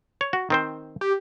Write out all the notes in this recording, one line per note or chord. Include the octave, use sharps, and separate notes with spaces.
C#5
F#4
D#3 C4 C5
G4